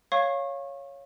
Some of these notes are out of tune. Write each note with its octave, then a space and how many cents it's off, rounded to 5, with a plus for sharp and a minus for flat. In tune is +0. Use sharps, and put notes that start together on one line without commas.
C#5 +0 F5 +0 C#6 -30